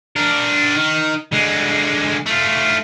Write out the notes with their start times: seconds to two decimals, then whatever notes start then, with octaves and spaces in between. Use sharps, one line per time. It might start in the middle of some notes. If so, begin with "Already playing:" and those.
0.16 D4 A#4
0.75 D#3
1.32 D3 G#3
2.26 A3 F4